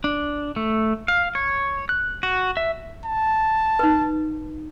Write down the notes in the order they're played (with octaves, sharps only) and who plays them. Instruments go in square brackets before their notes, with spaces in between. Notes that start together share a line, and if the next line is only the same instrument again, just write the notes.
[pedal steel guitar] D4
A3
F5
C#5
F#6
F#4
E5
[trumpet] A5
[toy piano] D#4 B4